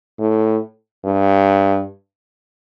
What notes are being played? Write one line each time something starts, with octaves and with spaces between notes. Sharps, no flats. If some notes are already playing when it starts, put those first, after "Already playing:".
A2
G2